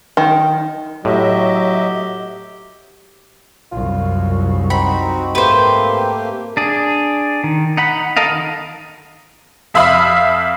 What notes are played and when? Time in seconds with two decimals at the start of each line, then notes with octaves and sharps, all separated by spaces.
0.17 D#3
1.05 A2 F#3 G4 D#5 E5
3.72 C2 F#2 F4
4.70 C4 D#4 F#4 B5
5.35 G#2 A3 A#3 G4 B4 C5
6.57 D4 G#4
7.44 D#3
7.77 D#4 F#5 B5
8.17 A4 A#4 D#5 F5
8.29 D#3
9.74 F2 E5 F5 B5 D#6